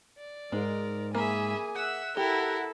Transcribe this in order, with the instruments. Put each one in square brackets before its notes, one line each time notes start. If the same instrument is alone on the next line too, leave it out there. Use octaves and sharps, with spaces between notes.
[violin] D5
[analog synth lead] G#2 [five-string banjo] G#3 [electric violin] A#4
[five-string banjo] A#3 [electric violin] G#4 G#5 [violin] E5 B5
[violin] E5 E6 [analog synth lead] F#5
[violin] E4 A#4 [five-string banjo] G4 [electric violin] A4